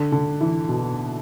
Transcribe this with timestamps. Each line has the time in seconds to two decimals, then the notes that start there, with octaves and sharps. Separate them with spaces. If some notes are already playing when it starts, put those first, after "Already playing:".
Already playing: D3
0.12 D3
0.41 E3
0.69 B2